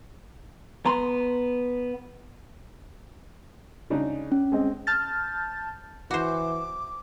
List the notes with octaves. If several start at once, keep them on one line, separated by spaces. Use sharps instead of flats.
B3 A#5 C6
C#3 D4 D#4
C#4
G#3 C4 D#5
A5 F6 G6 A6
E3 F#4 C5 D6